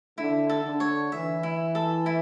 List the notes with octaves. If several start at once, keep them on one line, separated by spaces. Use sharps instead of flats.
D3 E4
A4
D3
C#5
E3 E5
E4
A4
E4